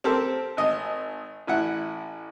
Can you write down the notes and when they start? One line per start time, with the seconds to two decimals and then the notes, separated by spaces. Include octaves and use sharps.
0.04 C4 G4 A4 A#4 C5
0.57 G#1 D#5
1.47 A1 E4 F#5